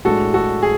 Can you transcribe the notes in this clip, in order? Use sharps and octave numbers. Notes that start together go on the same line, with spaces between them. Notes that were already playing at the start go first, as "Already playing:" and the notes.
A2 G#3 D4 F#4 A4
F#4 A4
G#4